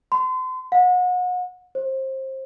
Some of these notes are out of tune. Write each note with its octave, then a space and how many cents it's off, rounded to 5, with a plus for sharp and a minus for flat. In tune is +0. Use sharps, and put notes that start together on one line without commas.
C6 -35
F#5 -35
C5 +25